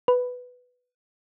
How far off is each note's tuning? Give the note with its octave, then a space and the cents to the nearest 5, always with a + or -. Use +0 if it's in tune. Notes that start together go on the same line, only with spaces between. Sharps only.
B4 +5